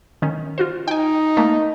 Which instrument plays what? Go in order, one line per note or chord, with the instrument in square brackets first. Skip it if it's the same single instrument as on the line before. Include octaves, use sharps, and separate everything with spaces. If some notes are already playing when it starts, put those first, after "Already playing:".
[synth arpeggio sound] D#3 C#4
F4 F#4 C5
[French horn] D#4 [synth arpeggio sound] G5 G#5
[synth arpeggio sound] A3 A#3